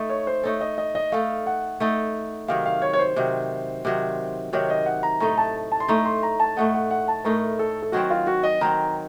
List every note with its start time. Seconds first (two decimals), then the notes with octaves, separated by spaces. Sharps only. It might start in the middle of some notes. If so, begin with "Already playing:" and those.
Already playing: A3 D#4 A4
0.09 C#5
0.27 C5
0.43 A3 D#4 A4 C#5
0.61 D#5
0.78 D#5
0.95 D#5
1.12 A3 D#4 A4 F5
1.46 F#5
1.80 A3 D#4 A4
2.48 C3 D#3 F#3 F5
2.66 F5
2.82 C#5
2.93 C#5
2.99 C5
3.16 C3 D#3 F#3
3.85 C3 D#3 F#3
4.53 C3 D#3 F#3 C#5
4.70 D#5
4.86 F#5
5.03 A#5
5.20 A2 A3 D#4 A#5
5.38 A5
5.72 A5
5.80 C6
5.88 A2 A3 D#4 A#5
6.05 C6
6.23 A#5
6.40 A5
6.57 A2 A3 D#4 F#5
6.74 F#5
6.91 F#5
7.08 A5
7.25 A2 A3 D#4 A#4
7.59 A4
7.82 A4
7.92 D#3 F#3 C4 F#4
8.10 F4
8.27 F#4
8.43 D#5
8.61 D#3 F#3 C4 A#5